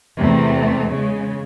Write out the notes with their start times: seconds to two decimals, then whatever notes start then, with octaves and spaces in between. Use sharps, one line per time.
0.17 E2 C3 A3
0.89 C#3 G#3